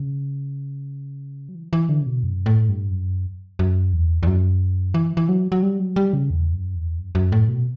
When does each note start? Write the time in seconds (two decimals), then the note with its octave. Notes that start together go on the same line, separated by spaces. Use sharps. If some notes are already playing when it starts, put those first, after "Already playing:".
Already playing: C#3
1.49 F#3
1.55 E3
1.73 E3
1.89 D3
2.01 C#3
2.06 B2
2.23 F#2
2.46 A2
2.69 G2
2.91 F#2
3.59 F#2
3.93 E2
4.23 E2
4.27 F#2
4.94 E3
5.17 E3
5.29 F#3
5.52 F#3
5.63 G3
5.79 F#3
5.96 G3
6.13 C#3
6.30 E2
6.53 F#2
6.75 E2
6.98 F#2
7.15 F#2
7.32 A2
7.49 B2